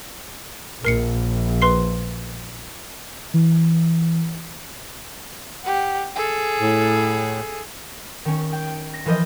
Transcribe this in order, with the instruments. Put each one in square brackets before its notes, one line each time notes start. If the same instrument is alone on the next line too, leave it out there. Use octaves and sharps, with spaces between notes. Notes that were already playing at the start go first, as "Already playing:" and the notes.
[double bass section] A#1 [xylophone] A#4 C7 C#7
[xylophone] B4 C6 C7
[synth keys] E3
[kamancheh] G4 F#5
G#4 A4
[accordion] A2
[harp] D#3 C#4
G5
A#6
E3 F3 A#4 C5 D#5